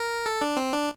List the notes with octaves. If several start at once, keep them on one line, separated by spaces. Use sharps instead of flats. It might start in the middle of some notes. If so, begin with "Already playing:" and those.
Already playing: A#4
A4
D4
C4
D4